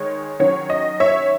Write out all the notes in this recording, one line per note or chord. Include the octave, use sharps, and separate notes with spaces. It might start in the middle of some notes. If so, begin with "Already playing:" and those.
Already playing: D#3 G#3 C#5
D#3 F#3 C#4 C#5
D#5
C#5 E5